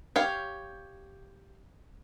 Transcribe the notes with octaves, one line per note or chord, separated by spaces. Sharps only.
G4 C#5 F5